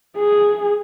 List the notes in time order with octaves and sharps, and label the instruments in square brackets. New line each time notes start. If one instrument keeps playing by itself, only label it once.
[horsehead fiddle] G#4